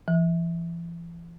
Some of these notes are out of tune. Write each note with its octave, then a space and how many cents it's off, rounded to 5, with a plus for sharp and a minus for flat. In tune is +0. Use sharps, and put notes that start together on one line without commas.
E3 +40